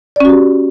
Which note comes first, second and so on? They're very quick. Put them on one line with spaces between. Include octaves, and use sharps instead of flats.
D5 C#4 F#4 G4